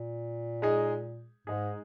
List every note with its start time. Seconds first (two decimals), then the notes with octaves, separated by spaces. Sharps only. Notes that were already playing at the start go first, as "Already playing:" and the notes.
Already playing: A#2
0.62 G#3 D#4 G#4
1.47 G#2 G#3 D#4 G#4